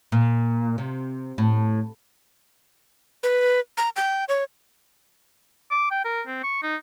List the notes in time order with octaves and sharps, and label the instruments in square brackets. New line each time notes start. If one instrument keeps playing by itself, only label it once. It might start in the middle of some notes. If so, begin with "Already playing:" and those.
[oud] A#2
C3
A2
[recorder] B4
A#5
G5
C#5
[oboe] D6
G5
A#4
C4
C#6
D#4